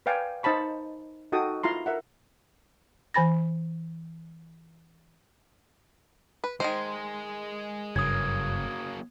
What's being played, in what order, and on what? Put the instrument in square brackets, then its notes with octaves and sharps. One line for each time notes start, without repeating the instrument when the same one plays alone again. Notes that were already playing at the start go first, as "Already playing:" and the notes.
[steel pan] B4 D5 F5 G5 G#5
D#4 C5 A5 B5 C#6
D#4 F#4 A4 G5 D#6
E4 F4 A#5 C6
A#4 E5 F#5
[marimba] E3 C5 G#5 B5 A6 A#6
[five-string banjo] B4
[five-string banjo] D#3 A3 C5 [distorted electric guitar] G#3
[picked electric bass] F#1 G2 C#3 [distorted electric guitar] F#3 A#3 [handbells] D#6 G#6